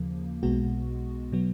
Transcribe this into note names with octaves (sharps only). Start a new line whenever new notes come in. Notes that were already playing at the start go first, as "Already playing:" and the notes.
Already playing: D#2 C#3 F3 A#3
B1 B2 G#3 B3 F#4
B2 F#3 B3